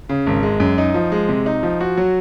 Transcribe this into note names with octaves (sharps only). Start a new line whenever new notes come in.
C#3
G#1
G#3
F#2
D#4
F3
G#3
C3
D#4
F3
F#4
F#3